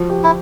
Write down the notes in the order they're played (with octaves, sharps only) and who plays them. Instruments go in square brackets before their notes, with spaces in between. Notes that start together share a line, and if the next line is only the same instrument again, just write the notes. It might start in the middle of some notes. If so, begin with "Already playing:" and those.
Already playing: [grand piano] F3 F#4
G4
[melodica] E4